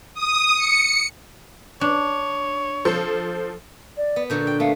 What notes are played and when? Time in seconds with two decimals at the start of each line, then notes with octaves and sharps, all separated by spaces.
0.14 D#6
0.55 C#7
1.81 D4 C#5
2.85 F3 A4 C5
3.97 D5
4.16 B3
4.30 A#2 D3 F#4 G6
4.47 G5
4.60 A3 B3 F5